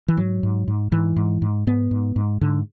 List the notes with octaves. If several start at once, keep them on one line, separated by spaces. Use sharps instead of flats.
E3
G#2 F#3
G#2
G#2
G#2 E3
G#2
G#2
G#2 B3
G#2
G#2
G#2 D3